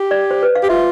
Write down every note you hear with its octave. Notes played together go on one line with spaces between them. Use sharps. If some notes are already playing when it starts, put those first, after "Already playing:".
Already playing: G4
D5
C5
B4
F5
G4
F4 E5